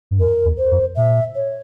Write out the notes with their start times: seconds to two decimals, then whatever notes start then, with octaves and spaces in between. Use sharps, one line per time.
0.11 G2
0.20 F2 A#4
0.45 E2
0.58 C5
0.71 F2
0.97 A#2 E5
1.35 C#5